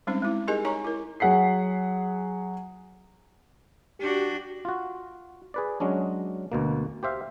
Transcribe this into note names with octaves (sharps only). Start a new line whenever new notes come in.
G3 G#3 C4 C#4 D#4 C5
G#3 C4 E4
D#4 G4 G#4 A#4 D#5 G#5
D#4 C#5 G#5 A#5 C#6
E4 A#4
F#3 G#4 F#5 B6 C7
D4 F#4 G4
F4 F#4
G#4 B4 D5
F#3 G#3 C#4 D4
D2 B2 A#3
G4 C5 E5 F5